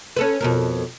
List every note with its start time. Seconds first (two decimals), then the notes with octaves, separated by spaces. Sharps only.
0.16 C#4 A4 B4
0.41 F2 B2 A#4